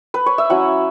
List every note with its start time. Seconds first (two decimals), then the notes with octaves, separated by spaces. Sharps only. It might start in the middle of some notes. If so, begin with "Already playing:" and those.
0.14 B4
0.26 C#5
0.38 E5
0.50 F#3 C#4 E4 F#5